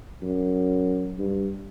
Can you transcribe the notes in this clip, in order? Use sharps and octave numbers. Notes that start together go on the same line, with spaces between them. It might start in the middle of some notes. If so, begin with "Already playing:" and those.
F#2
G2